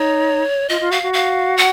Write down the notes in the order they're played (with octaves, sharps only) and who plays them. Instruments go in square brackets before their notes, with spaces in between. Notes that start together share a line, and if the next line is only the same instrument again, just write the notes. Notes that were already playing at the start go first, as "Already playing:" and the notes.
Already playing: [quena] D#4 [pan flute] C#5
[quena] F4 [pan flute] D#5
[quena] F4
[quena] F#4 [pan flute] F5
[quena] F#4
[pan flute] F5
F#5